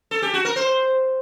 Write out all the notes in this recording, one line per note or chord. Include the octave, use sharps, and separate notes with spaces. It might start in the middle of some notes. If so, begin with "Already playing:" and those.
A4
G4
F#4
A#4
C5